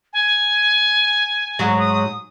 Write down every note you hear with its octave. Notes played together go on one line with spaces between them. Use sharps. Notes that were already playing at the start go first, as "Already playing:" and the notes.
G#5
G#2 F#3
D#6